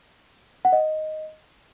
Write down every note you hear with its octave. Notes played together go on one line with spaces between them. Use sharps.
F#5
D#5